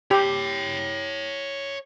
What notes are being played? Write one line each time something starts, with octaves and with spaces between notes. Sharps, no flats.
G4 C#5 G5